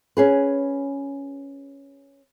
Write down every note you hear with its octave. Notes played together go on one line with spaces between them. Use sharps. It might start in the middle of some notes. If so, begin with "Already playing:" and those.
C#4 G#4 B4